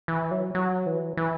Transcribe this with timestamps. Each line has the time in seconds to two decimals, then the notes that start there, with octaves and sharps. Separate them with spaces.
0.08 E3
0.31 F#3
0.55 F#3
0.86 E3
1.17 E3